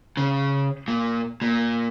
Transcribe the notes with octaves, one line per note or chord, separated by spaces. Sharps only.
C#3
A#2
A#2